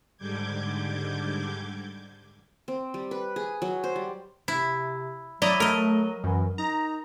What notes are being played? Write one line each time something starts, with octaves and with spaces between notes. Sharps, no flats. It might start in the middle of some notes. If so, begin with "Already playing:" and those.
G#2 D3 G3 D6 G6 G#6
C4
G3
B4
G#4
F#3
C5
G3
C3 E4
F#3 E4 D5 D#5 A#5
A3 A#4 D#5
F#2 E3
D#4 A#5